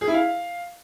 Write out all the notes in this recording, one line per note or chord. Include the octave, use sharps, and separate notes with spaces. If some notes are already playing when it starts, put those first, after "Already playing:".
G#4
E4
F5